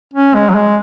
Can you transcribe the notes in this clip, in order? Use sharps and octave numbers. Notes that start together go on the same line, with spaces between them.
C#4
G#3
F#3
G#3